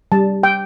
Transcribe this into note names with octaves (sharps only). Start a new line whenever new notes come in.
G3 A5
G5